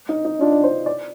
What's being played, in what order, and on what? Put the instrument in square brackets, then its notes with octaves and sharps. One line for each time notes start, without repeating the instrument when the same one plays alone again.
[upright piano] D#4
D#4
[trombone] D4 [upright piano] F4
[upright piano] D5
C5
D5